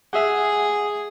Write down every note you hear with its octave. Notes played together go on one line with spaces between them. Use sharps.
G#4 E5 F#5